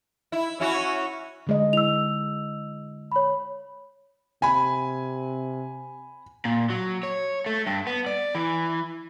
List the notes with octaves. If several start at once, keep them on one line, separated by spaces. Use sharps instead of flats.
E4
C#4 E4 F#4
D3 G#3 D#5
E4 E6 F7
C#5 B5
C3 G#5 B5
A#2
F#3
C#5
A3
G2
B3
D5
E3